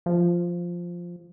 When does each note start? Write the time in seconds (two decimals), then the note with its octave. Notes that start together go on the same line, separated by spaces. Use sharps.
0.06 F3